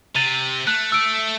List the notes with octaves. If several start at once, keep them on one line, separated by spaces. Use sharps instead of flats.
C3 A6 D#7 F7
A3 F#6
E6 D7